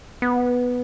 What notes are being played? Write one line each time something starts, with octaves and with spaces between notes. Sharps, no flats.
B3